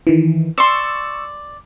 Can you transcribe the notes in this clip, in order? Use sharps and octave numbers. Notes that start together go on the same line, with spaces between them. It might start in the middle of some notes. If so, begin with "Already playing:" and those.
D#3 E3
D5 C6 C#6 E6